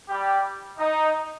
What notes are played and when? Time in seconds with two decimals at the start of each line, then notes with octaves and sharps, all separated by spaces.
0.08 G3 G4
0.78 D#4